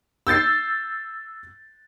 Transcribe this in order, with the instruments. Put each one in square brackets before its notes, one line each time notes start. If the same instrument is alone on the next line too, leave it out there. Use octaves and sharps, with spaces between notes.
[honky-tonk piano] E6 G6 A6 C7